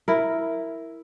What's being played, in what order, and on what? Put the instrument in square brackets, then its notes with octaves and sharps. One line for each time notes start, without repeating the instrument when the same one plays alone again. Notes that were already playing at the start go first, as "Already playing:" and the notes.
[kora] E4 A#4